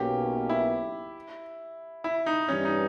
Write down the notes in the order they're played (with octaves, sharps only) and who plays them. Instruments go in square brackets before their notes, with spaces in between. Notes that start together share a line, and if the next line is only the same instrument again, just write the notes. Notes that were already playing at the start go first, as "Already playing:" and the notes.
Already playing: [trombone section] B1 B2 A#3 C#4 [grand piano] G4
[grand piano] E4
E4
D#4
[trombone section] G2 E3 G3 [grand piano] C#4
[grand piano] D#4